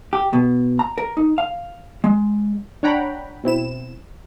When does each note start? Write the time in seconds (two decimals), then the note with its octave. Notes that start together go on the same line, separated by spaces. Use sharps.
0.13 G4
0.33 B2
0.79 A#5
0.98 A#4
1.17 D#4
1.38 F5
2.04 G#3
2.83 D4 C#5 F#5 G5 A#5 B5
3.44 B2 C4 E4 E7